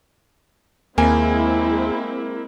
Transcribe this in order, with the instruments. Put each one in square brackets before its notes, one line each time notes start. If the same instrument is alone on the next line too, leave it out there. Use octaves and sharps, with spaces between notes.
[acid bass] D#2 [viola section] G#3 C4 E4 [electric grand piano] A#3 [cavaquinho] G#5